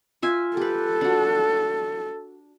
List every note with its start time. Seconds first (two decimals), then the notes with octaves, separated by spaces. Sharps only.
0.22 F4 E5 G#5
0.57 G4 A4 B4
1.01 D4 F#4